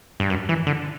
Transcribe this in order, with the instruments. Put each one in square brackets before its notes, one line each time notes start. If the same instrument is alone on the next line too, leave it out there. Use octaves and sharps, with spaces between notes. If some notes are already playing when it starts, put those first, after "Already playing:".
[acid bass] G2
F#2
E3
D3